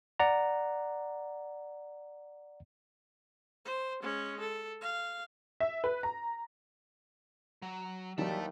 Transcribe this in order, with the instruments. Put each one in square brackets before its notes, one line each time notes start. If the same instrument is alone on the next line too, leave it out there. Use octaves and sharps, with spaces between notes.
[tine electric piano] D5 F#5 A#5
[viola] C5
G#3 C#4
A4
F5
[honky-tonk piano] E5
B4
A#5
[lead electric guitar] F#3
[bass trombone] D#2 [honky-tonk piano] E3 F#3 [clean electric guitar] G3 [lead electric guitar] E5 A5